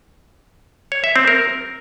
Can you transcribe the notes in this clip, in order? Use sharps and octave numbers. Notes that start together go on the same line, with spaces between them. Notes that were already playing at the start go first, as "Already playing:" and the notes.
C#5
E5
C4
A#4